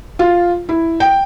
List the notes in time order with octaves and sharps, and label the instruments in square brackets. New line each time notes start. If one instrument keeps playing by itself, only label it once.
[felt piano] F4
E4
G5